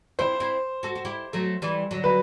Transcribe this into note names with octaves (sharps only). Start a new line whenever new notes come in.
C4 E4 C5
C4 E4
F#4 A4
F#4
E4 G4
F#3 A3
E3 G3
D3 F#3
B4